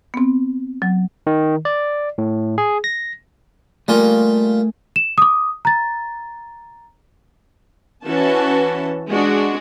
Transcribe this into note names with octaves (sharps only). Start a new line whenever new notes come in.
B3 C4
F#3
D#3
D5
A2
G#4
A#6
G3 A3 A#3 F4 G#5
E7
D6 D#6
A#5 A6
E3 C#4 F#4 A5
G#3 D4 F#4